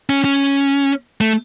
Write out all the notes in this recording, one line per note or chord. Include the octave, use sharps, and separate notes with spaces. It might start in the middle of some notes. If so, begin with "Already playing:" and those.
C#4
C#4
A3